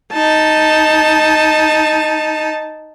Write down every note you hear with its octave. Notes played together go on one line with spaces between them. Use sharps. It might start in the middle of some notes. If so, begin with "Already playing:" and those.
D#4 A5